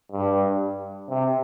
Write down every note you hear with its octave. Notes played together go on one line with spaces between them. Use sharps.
G2
C3